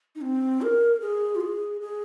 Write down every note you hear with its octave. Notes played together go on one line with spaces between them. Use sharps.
D#4
C4
A#4
G#4
F4
G#4
G#4